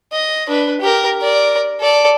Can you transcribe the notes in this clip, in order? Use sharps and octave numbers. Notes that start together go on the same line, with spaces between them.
D#5
D4 B4
G4 A#4
A#4 D5
A4 D5